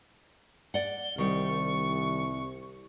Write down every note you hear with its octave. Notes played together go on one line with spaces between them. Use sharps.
D5 F#5 G7
C2 D#3 G3 C#6